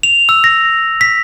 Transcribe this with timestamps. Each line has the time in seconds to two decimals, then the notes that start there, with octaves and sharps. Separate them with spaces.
0.03 F7
0.29 E6
0.44 A#6
1.01 B6